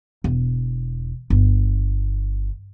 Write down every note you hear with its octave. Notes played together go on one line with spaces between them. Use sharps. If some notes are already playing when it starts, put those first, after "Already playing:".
E1
G1